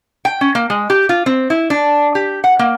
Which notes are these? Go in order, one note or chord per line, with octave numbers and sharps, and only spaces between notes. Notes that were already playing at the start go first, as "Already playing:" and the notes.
G5
C#4
A#3
G#3
G4
F4
C4
E4
D4
G4
F#5
A#3